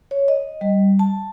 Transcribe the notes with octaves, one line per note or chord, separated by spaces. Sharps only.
C#5
D#5
G3
A5